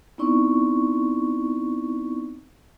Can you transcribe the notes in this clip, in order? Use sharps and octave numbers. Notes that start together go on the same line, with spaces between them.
B3 C4 D#4 E4 D5 C#6